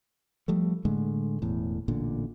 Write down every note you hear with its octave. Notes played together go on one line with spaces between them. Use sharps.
F3 G3 A3
A2 D3 G#3 A3
E1 E2 A2
A1 A#2 D3